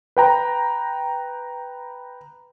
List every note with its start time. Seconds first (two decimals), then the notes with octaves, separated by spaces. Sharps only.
0.17 B4 G5 A#5